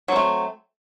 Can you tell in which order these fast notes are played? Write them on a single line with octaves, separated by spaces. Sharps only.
F#3 C4 A3